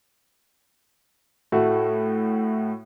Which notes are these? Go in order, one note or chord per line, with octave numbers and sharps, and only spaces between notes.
A2 A3 F#4